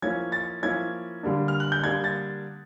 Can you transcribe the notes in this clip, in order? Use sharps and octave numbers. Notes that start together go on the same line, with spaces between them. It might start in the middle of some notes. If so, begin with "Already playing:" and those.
F3 A#3 C#4 E4 G#6
A6
F3 A#3 C#4 E4 G#6
D3 G3 A#3 D4
F6
F#6
G6
D3 G3 A#3 D4 G#6
A6